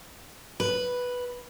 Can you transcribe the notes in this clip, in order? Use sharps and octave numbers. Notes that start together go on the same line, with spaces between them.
B4